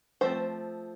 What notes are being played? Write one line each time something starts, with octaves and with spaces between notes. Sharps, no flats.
F3 A3 C4 C5